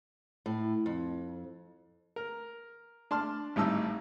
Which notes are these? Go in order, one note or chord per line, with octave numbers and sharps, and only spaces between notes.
A2
F2
A#4
D4 A5 C6 F6
G#1 A2 G3 D#4 A5 E6